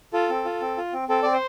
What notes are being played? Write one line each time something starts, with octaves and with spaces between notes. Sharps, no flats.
F4 A4
C4
F4
C4
F4
C4
C4 A4
C4 D5
C5